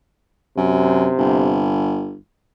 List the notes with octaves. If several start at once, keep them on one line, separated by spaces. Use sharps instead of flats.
F#2 C3
G1